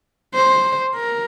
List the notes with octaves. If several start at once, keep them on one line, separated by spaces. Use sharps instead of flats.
C5
A#4